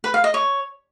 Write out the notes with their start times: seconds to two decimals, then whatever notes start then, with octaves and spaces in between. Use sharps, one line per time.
0.04 B4
0.14 F5
0.24 D#5
0.34 C#5